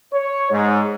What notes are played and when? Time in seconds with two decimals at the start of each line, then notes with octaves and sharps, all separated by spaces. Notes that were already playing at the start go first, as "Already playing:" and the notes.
0.14 C#5
0.51 G#2